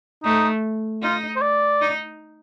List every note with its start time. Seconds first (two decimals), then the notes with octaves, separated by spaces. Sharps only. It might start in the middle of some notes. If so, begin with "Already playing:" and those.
0.24 A3 D#4
1.02 D#4 F4
1.36 C5
1.41 D5
1.81 D#4